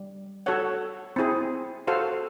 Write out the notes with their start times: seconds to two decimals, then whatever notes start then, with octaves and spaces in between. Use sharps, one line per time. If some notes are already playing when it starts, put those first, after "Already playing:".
Already playing: G3
0.46 F#4 A4 C#5 F#5
1.16 C4 E4 G#4
1.87 F#4 A4 C5 F5